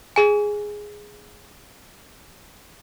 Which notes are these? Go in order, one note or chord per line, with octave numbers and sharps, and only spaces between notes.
G#4 G#5